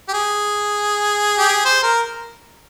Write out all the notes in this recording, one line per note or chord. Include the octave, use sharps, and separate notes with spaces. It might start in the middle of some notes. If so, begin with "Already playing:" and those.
G4
G#4
G4
G#4
C5
A#4